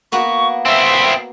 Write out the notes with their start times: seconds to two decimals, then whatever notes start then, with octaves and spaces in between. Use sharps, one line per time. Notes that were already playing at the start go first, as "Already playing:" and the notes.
0.12 A#3 B3 F#4 C#6
0.66 C4 E4 E5